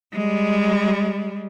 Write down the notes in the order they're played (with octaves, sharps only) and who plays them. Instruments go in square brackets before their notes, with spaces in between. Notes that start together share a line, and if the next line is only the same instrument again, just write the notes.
[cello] G3 G#3